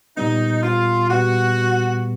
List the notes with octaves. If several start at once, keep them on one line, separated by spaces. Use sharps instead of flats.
A#2 G3 B3 D#4
F4
A#2 G3 B3 F#4